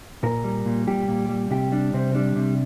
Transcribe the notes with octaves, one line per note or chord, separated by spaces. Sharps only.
A#2 A#4
G3
A#2
G3 G4
A#2
G3
C3 G4
G3 D4
C3 C4
G3 D4
C3